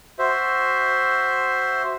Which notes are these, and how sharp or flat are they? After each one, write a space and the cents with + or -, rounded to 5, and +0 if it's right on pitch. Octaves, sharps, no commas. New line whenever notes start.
F#4 +10 C5 +5 E5 +0